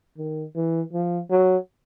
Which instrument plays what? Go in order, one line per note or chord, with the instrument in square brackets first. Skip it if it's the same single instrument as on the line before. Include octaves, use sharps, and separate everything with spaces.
[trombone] D#3
E3
F3
F#3